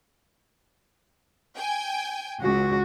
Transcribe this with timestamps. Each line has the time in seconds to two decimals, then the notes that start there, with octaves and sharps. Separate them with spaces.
1.55 G5 G#5
2.41 C#2 F#4